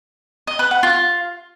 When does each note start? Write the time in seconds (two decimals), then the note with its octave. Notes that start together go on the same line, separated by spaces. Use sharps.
0.47 D#5
0.59 B4
0.71 F#5
0.83 F4